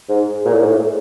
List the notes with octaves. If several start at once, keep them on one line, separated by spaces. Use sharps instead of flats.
G#2
A#2
A2
G#2
A2